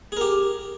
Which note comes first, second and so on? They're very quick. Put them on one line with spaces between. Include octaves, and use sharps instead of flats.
G#4 A#4 G4